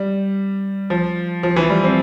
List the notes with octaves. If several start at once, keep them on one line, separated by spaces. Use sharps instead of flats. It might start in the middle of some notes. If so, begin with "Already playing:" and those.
Already playing: G3
F3
F3
E3
G3
C4